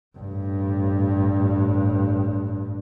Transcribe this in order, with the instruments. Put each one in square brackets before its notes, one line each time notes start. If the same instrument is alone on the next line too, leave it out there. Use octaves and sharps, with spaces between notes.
[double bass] A1 G2